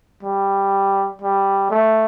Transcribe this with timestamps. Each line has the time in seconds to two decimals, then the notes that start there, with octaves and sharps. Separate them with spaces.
0.23 G3
1.22 G3
1.71 A3